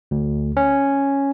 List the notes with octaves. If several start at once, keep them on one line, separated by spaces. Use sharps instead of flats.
D2
C#4